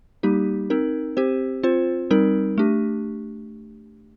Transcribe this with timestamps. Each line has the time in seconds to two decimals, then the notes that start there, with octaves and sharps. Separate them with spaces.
0.23 G3 A#3 D#4 G4
0.70 C4 D#4 A#4
1.17 C4 G4 C5
1.63 C4 F4 C5
2.10 G3 C4 D#4 A#4
2.58 A3 D4 G4